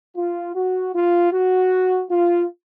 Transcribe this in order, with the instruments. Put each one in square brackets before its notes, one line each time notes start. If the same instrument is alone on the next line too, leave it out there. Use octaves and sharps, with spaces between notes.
[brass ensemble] F4
F#4
F4
F#4
F4